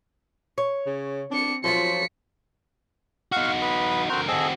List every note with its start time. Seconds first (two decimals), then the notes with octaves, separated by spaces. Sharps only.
0.58 C#5
0.86 C#3
1.31 C4 D4 C#7
1.64 F3 F#3 F4 B6 C#7
3.32 D#4 F#4 F5 F#5 C#6
3.62 B4 B5 D#6
4.10 D3 C4 F#4 A#4 C5
4.28 C4 F#4 G#4 A4 D#5